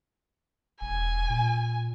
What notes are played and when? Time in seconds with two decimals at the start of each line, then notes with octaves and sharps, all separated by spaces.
0.81 E1 G#5
1.30 A#2